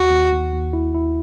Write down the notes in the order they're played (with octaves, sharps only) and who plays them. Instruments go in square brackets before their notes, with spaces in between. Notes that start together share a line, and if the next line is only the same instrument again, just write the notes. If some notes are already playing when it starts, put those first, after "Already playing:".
Already playing: [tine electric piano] D#2 [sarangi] F#4
[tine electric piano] D#2
D#2
D#2
E4
E4